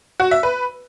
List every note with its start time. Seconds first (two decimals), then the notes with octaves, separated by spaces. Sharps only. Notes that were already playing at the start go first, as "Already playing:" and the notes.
0.20 F#4
0.31 E5
0.43 B4